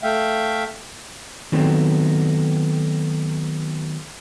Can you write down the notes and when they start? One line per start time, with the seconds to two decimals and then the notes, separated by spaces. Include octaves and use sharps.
0.03 A3 E5 F5 G5
1.52 D#3 F#3 A3 B3 C4